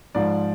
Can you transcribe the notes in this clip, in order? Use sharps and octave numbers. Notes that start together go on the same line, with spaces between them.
G#2 F3 D5